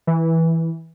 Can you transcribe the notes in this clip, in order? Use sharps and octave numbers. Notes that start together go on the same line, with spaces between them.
E3